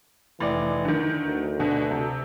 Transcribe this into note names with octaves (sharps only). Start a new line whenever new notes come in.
F1 E3 D5
D3 D#3
D2
B2 D3
C3